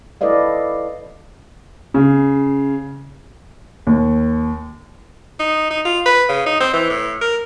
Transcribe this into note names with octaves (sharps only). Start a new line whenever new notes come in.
E4 A4 B4 D5 D#5 F5
C#3
D#2
D#4
D#4
F4
B4
C#3
D#4
C4
E3
A2
A#4